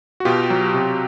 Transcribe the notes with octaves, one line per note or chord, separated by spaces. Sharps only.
F#4
B2 F4 G4
F#3
C3